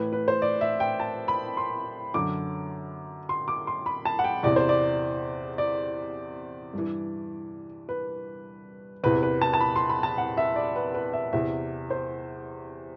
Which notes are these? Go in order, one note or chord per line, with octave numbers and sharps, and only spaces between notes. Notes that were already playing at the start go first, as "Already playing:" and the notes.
Already playing: A2 E3 B4
B4
C5
D5
E5
G5
A5
B5
C6
F#2 D3 D6
C6
D6
C6
B5
A5
F#5
G5
E2 C3 E3 D5
C5
D5
D5
G2 E3
B4
E2 C3 E3 B4
B4
A5
A5
B5
C6
B5
A5
F#5
E5
D5
B4
B4
E5
E2 C3 E3 E5
C5